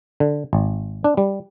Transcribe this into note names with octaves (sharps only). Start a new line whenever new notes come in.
D3
G#1
D4
G3